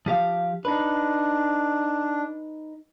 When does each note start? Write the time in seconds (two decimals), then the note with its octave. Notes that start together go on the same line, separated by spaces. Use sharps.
0.06 F3 G4 F5
0.65 D4 D#4 B4